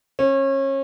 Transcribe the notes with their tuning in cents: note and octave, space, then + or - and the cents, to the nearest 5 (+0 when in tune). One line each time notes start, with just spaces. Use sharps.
C#4 -30